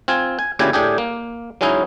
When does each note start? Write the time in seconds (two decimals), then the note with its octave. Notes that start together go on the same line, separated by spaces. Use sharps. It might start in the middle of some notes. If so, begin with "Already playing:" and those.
0.08 C4 F4 G#5
0.39 G#5
0.59 D2 A#2 C#3 E4 G4 G#5
0.73 A2 D4 G4 G#4
0.98 A#3
1.61 F#3 G#3 C#4 D#4 E4